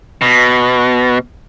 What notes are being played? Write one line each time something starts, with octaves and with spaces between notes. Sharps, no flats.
B2